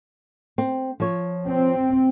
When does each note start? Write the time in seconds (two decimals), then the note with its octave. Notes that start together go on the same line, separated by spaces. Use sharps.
0.58 C4
1.00 F3 C#5
1.49 C4